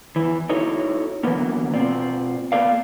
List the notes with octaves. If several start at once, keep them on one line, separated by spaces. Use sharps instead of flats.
E2 E3
D#4 E4 F#4 A4 C#5
D3 E3 F#3 A#3 B3 C#4
B2 C4 F4 D5
A#3 B3 A4 D5 F5